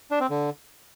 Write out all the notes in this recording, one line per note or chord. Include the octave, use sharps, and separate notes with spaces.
D4
C4
D3